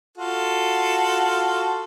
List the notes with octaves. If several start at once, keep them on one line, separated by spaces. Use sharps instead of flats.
F4 F#4 A4